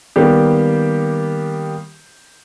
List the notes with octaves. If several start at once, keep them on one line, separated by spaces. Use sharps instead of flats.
D#3 G3 A#3 B3 G4